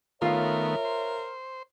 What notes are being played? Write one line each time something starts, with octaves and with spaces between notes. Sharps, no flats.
D#3 A3 B3 F4 A#4 C#5 E5 F5
C5